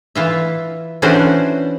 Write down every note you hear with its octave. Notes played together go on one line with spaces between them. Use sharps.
E3 F4 E5
E3 C#4 D4 F#4 C5 D5